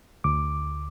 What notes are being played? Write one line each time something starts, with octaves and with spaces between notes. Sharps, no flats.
D2 D6